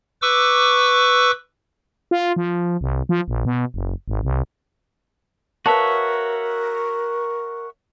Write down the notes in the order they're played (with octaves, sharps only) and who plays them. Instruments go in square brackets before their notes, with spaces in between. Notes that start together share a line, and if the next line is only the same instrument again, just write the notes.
[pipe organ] B4 C#6 D6 E6
[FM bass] F4
F3
C2
F3
A#1
B2
F#1
G#1
C2
[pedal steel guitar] F#4 C#5 E5 [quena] A#4 [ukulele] B4 F5 A5